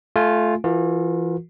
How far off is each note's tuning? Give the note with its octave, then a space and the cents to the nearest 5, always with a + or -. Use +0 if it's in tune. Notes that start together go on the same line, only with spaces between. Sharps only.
A3 -15 F4 +0 G#5 +0
E3 +30 F4 +45 A#4 +0